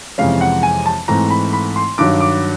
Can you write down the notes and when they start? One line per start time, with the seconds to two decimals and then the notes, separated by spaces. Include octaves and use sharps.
0.18 F2 C3 E3 G#3 C#4 F5
0.41 F#5
0.63 G#5
0.86 A5
1.08 G#2 E3 A3 C4 A#5
1.31 B5
1.53 B5
1.76 C6
1.98 G2 D#3 F#3 D6
2.20 D6